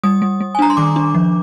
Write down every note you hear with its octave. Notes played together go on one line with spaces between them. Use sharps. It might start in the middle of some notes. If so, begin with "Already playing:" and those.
G3 D#6
G3
G3
G#5
D4 A#5
C6
D#3 D6
D4
F3